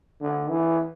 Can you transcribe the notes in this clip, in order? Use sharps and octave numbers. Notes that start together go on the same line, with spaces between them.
D3
E3